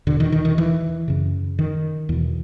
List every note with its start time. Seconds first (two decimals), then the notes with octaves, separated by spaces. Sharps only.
0.07 E2 B2 D3
0.20 D#3
0.32 D#3
0.45 D#3
0.58 E3
1.08 F#2 C#3
1.59 D#3
2.09 E2 B2